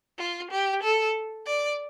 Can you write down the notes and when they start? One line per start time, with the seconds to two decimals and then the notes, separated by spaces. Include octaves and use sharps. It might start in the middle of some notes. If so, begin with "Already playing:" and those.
0.18 F4
0.51 G4
0.83 A4
1.46 D5